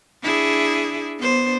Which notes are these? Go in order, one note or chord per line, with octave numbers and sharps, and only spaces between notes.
D4 E4 G#4
B3 D4 C5